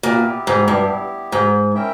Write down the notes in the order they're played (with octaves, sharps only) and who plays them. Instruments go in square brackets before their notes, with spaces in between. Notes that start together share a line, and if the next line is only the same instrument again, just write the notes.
[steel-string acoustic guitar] A#2 [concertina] B3 E4 G4
[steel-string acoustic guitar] G#2
G2
G#2
[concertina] C#4 E4 A#4 E5 G5